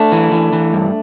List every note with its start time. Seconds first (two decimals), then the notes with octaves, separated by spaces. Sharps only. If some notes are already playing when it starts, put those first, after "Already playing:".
Already playing: A3 D4
0.12 E3
0.32 E3
0.53 E3
0.73 G2